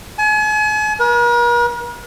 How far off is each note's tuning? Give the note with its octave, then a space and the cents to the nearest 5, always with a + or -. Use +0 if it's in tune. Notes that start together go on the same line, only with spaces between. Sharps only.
G#5 +40
A#4 +45